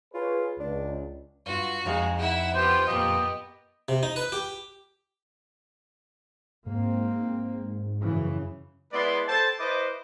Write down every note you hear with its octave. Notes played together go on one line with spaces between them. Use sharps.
F4 G#4 B4 C#5
C#2 D4
G2 F4 F#4
F2 G#3 D#4 F5
E4 E5 F#5
B3 F4 G4 C5
F2 A#2 B3 G4 D#5
C3
D#4
B4
G4
G#2 A#3 C4
F#2 C#3 E3
G#3 B3 E4 B4 D5 C6
A4 C5 G5 A5
E4 B4 C5 D#5 D6